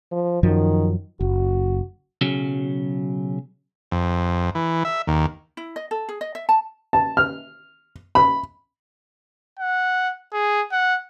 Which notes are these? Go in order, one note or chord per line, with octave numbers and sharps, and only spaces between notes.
F3
F#2 D#3 F3 F#3
F#1 F#4
B1 C#3 F#3
F2
E3
E5
D#2
E4
D#5
A4
G#4
D#5
E5
A5
A5
F6
B5
F#5
G#4
F#5